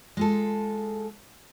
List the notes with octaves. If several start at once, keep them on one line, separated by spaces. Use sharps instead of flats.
G#3 F4 A4